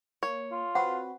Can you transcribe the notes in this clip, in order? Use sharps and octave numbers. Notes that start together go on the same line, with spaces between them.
A#3 C#5
F4
C4 F#4 B4 F#5